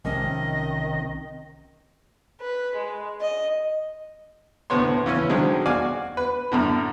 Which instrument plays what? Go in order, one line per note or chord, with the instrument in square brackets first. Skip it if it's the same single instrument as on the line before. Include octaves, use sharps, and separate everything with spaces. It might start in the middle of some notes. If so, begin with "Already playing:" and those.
[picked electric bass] B1 F3 [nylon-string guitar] C3 A#3 C#4 [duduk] D#3 [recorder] D#5
[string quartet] B4
G#3
D#5
[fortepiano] D2 A2 C3 B3 C#5 C6
C#3 E3 C#4
B2 D3 D#3 F#3 G#3 C4
F#4 D5 F5 G#5 D6
B4
F#2 A2 D3